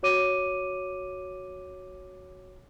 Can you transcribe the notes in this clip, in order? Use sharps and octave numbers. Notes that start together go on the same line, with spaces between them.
F#4 C#5 D6 D#7